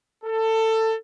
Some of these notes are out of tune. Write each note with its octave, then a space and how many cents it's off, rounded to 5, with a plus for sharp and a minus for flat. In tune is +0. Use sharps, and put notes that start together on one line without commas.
A4 +20